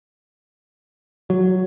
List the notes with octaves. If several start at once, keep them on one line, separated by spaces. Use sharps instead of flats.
F#3